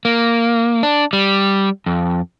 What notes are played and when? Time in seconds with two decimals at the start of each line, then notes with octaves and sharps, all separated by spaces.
0.05 A#3
0.83 D4
1.13 G3
1.86 F2